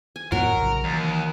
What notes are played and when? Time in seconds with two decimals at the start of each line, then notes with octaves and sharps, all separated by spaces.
0.16 G#5
0.32 F2 A2 F#3 B3 F#4 A#4
0.57 A#1 C#3
0.84 D#2 E3